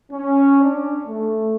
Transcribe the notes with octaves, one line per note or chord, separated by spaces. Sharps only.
C#4
D4
A3